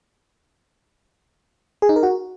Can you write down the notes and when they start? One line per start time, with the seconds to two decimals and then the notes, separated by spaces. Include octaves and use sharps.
1.82 G#4
1.89 D#4
1.96 A#4
2.03 F#4